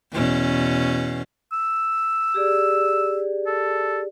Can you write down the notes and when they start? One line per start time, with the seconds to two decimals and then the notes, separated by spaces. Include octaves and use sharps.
0.12 E2 B2 C#4
1.52 E6
2.34 G4 G#4 D5
3.46 A4